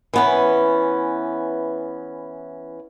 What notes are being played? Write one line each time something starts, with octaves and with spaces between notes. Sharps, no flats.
E3 B3 C#4